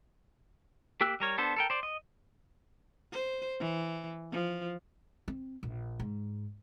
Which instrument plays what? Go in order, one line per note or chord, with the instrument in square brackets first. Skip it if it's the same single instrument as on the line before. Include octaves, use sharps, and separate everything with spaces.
[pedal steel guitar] A#3 G4 G5 E6 F#6
G3 A#4 C#5
B3 D4 A4 C5
A4 A#4 G5
C5 D5
D#5
[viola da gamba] C5
E3
F3
[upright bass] C4
A#1
G#2